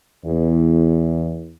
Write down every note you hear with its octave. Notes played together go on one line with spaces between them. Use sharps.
E2